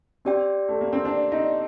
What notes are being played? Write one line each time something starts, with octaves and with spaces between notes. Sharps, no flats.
C4 G4 D5 G5
A3
A#3
C4
D4
D#4